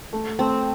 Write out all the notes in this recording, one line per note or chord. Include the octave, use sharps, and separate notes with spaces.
A3
A3 C4